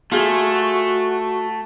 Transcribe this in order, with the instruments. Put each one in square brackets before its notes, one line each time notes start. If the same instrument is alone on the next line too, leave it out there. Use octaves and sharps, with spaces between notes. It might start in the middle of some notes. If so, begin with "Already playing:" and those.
[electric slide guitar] A3 [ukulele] F4 G#4 [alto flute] F#4